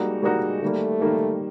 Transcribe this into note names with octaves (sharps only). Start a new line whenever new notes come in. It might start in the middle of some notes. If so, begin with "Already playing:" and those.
Already playing: G3 G#3 A#3 D#4 F#4 A#4
G3 A#3 D#4 F#4 A#4
D#3 G3 A3 A#3
D#3 G3 A#3